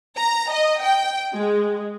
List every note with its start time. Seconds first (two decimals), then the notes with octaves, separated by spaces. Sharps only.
0.17 A#5
0.52 D#5
0.82 G5
1.35 G#3